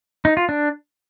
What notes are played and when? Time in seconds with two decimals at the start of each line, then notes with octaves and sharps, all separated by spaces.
0.25 D#4
0.37 F4
0.49 D4